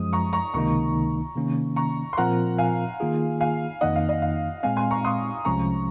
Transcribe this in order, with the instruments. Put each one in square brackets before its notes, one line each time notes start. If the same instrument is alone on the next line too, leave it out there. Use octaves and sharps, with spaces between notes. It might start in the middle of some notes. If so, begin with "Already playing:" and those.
Already playing: [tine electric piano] F#2 F3 G#3 [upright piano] D#6
[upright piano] A#5 C#6
A#5 C#6
[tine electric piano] C#2 C3 D#3 A#3 D#4 [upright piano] A#5 C#6
[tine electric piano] C3 D#3 A#3 C#4
[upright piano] A#5 C#6
C6
[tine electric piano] A#2 F3 C4 F4 A#4 [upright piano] F#5 A#5
[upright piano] F5 G#5
[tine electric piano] D#3 A#3 F4 G#4
[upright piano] F5 G#5
[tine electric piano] F2 D#3 A#3 D#4 [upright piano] D#5 F#5
[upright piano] F5
D#5
F5
[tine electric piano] A#2 G#3 C4 [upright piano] F5 G#5
[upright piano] G#5 C6
A#5 C#6
C6 D#6
[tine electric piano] C2 C3 F3 G#3 C#4 [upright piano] A#5 C#6